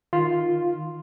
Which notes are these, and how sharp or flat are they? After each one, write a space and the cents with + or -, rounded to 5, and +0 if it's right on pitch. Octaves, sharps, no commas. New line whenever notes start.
D#3 +0 F4 +0